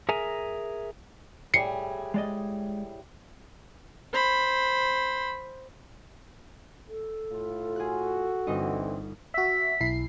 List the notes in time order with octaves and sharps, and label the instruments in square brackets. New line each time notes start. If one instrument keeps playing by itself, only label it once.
[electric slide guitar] G#4 A#4 E5 G#5 A#5
[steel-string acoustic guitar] A2 G3 G#4 [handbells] C7 C#7
[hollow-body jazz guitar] G#3 D5 D#5
[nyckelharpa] C5 B5
[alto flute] A4
[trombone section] A2 F4
[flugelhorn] F#4 [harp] G#4 F#6
[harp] G1 D#4 D#5 [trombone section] D3 E3 C4
[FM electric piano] F#4 E5 [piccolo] B6
[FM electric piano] B1 E4 C7